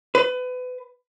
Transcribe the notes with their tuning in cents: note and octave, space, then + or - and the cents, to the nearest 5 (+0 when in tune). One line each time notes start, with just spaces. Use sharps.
B4 +30